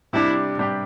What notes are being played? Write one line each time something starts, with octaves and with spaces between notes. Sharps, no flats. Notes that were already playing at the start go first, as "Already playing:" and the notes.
C3 G3 D4 E4 G4
C3 G3 D4 G4